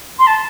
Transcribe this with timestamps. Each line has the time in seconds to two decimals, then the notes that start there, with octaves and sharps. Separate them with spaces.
0.19 C6
0.27 A5